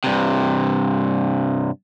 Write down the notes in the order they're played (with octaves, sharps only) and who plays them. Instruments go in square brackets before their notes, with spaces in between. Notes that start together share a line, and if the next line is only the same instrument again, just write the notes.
[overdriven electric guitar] G2 C3